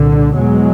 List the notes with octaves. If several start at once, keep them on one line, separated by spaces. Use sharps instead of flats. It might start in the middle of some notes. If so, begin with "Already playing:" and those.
Already playing: C2 A#2 D3
E2 B2 F#3 G#3